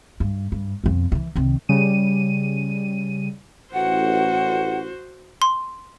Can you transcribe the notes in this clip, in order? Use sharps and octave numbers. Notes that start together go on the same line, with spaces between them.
G2
G2
F2 B2
C#3 E3
C2 D#3
C#3 G3 D#7
A1 F#4 C5 F#5
C6